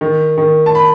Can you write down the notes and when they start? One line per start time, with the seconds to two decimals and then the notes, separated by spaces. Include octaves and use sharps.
0.01 D#3
0.38 D#3
0.66 A5
0.75 B5